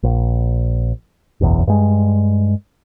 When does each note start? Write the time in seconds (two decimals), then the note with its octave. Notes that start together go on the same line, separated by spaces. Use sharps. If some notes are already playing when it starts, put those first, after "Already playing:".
0.03 A#1
1.41 F#1 B1 E2
1.67 G2 G#3